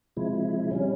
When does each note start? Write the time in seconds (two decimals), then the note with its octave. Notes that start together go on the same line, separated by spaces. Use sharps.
0.17 C3 F3 G#3 E4
0.71 C3 G3 C#4